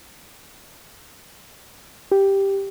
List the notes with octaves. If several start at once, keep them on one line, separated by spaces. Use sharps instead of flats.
G4